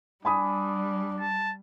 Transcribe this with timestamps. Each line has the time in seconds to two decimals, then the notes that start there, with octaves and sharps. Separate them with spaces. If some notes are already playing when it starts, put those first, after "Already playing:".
0.25 G3 D4 G#5 B5 D#6
1.20 A5